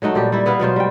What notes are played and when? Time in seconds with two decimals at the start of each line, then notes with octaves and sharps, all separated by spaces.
0.02 F#3 A3 D#4 F#4
0.15 A#2 G3 G4
0.32 G3 E4
0.46 B3 E4 B4 F5
0.60 B2 F#3 F4 C5
0.76 G3 G5